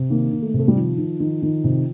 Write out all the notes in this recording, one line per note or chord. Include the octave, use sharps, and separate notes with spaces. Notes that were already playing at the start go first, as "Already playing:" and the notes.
Already playing: C3
D#3 A#3
D#3
A3
C3
A3
G3
D#3 F3
D#3
D#3
D#3
C3